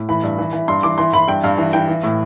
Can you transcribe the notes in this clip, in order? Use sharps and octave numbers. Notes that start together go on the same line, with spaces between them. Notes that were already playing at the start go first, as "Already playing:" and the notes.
Already playing: A2
E3 B5
G2
E3
E3
G2 C6
E3 D6
E3 C6
E3 B5
G2 G5
G2 F5
E3
E3 G5
E3
A2